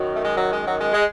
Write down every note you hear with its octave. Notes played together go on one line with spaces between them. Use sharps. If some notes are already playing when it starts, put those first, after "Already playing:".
Already playing: F#2 D#3 F#3
A3
G#3
F#3
G#3
F#3
G#3
G#3